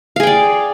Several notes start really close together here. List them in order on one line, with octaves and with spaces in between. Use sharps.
F5 G#4 G5 D5